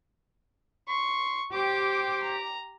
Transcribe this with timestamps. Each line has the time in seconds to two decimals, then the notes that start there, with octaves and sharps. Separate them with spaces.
0.88 C6 C#6
1.54 G4 C5 D6
2.23 A#5